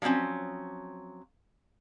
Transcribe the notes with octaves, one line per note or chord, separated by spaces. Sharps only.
F3 F#3 G#3 C4 C#4